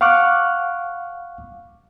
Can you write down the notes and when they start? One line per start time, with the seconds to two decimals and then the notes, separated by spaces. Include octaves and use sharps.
0.01 F5 F#5 C#6 D6 F6 F#6